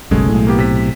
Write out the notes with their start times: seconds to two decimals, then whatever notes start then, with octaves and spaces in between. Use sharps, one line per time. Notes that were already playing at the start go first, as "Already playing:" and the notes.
0.11 F#1 B1 F#2 G#3 A3 G#4
0.29 B1 A2
0.47 A#3 B3 G4
0.59 C3 B6